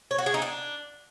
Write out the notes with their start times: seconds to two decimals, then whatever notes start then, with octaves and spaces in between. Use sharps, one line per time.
0.11 C#5
0.19 F#4
0.26 G#4
0.34 D#4
0.42 D4